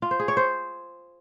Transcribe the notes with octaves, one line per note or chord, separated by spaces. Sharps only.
F4
C5
G#4
C#5
C5